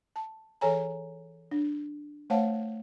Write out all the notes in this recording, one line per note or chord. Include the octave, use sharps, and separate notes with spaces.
A5
E3 G#4 A4 C#5 G#5 A#5
D4
A3 C5 C#5 F5 F#5 A5